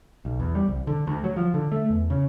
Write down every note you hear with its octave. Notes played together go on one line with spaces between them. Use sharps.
B1
E2
G3
C2
D3
D2
F#3
F3
D3
A3
E2
C#3